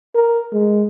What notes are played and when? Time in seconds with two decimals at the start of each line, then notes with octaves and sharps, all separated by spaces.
0.15 A#4
0.53 G#3